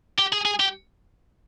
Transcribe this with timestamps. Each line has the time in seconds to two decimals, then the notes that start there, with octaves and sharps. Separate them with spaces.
0.19 G4
0.33 G#4
0.45 G#4
0.60 G4